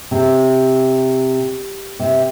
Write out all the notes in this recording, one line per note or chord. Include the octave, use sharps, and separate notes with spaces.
C3
C3